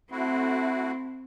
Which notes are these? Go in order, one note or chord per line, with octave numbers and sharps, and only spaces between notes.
A3 C4 E4 F#4